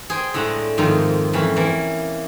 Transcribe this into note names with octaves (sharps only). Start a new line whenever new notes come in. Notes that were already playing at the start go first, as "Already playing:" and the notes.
G#4 C5 G5
A2 D3 G#3 D4 F#5 A#5
F2 G#2 D#3 F4 A4 F5
F2 E3 C#4 B5
E3 A#3